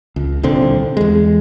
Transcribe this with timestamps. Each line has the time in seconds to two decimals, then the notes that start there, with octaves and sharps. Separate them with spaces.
0.16 C#2
0.43 D#1 C2 D3 C4
0.97 E2 G#3